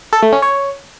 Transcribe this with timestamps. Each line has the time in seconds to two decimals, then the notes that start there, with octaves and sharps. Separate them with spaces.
0.13 A4
0.23 A3
0.33 C#4
0.42 C#5